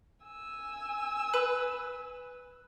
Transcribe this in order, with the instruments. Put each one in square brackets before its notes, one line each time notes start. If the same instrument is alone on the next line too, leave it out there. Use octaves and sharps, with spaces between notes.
[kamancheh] G#5 E6
[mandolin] B4